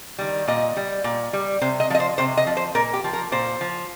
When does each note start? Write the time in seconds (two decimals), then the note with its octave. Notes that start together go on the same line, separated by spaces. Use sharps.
0.18 D#3 G3
0.48 A#2 D#5
0.77 G3
1.04 A#2
1.33 G3
1.61 C3 C5
1.80 D#5
1.90 F3 D#5
2.00 C5
2.18 C3 C5
2.37 D#5
2.47 F3
2.57 C5
2.75 A#2 A#4
2.93 G4
3.04 F3
3.13 A#4
3.32 A#2 C5
3.61 F3